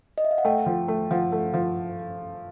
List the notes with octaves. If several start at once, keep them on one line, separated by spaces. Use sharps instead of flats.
D#5
E5
F5
F#5
A3 G5
F3
A3
F3 F#5
A3
F3